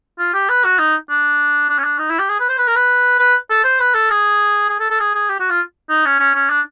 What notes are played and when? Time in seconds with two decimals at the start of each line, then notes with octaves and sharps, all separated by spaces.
0.19 F4
0.34 G4
0.49 B4
0.64 F#4
0.79 D#4
1.09 D4
1.69 D4
1.78 C#4
1.84 D4
1.98 D#4
2.09 E4
2.19 G4
2.30 G#4
2.40 B4
2.49 C5
2.58 B4
2.67 A#4
2.76 B4
3.19 B4
3.50 A4
3.64 C5
3.80 B4
3.94 A4
4.10 G#4
4.69 G#4
4.80 A4
4.90 A4
4.99 G#4
5.14 G#4
5.29 G4
5.40 F#4
5.50 F4
5.90 D#4
6.05 C#4
6.20 C#4
6.34 C#4
6.50 D4